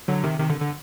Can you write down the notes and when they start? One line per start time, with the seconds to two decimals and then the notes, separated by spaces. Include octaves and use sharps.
0.08 D3 F#3
0.24 C3 D#3
0.40 C3 D#3
0.50 D3
0.60 D3